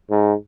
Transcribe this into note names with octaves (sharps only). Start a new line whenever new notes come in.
G#2